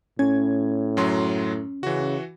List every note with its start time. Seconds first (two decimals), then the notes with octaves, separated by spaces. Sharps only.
0.19 A2 C#4 G#6
0.97 F#2 F#3 C6
1.83 C#3 E3 F#4